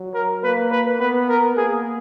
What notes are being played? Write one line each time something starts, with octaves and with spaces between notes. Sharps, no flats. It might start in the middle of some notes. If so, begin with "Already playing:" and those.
Already playing: F#3
A#4
A#3 B4
B4
B3 B4
A#4
A#3 G#4